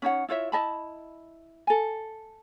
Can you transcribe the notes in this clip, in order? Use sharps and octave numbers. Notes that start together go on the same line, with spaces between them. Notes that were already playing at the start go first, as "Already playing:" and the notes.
C#4 D#4 C#5 F#5
E4 F4 C#5 E5
E4 D#5 A5 B5
A4 G#5